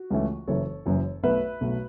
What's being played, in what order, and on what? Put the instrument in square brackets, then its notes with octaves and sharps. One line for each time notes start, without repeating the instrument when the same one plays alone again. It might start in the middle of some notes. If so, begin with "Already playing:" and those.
Already playing: [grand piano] F#4
C#2 C#3 E3 A3
F#1 F#2 E3 A4 C#5
F#1 F#2 E3
B1 B2 A3 B4 E5
B1 B2 A3